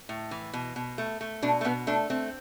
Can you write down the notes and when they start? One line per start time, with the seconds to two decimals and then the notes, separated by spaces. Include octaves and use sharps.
0.09 A2
0.31 E3
0.53 B2
0.76 B2
0.98 A3
1.21 A3
1.42 B2 D4
1.61 A3
1.65 B2 B3
1.87 A3 D4
2.10 A3 C4